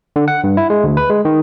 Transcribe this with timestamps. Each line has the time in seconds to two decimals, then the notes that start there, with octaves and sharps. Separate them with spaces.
0.16 D3
0.28 F#5
0.44 G2
0.57 E4
0.70 G#3
0.84 D2
0.97 B4
1.10 G#3
1.25 D#3